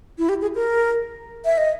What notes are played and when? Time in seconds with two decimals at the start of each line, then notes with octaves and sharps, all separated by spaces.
0.18 E4
0.29 G4
0.42 G#4
0.55 A#4
1.45 E5
1.58 D#5